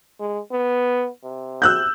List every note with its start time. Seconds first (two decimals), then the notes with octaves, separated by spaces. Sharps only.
0.20 G#3
0.52 B3
1.24 C3
1.62 E6 F#6 G6